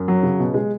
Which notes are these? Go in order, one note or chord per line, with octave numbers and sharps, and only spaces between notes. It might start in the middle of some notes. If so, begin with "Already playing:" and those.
Already playing: F#2
F#3
C#3
B2
G#3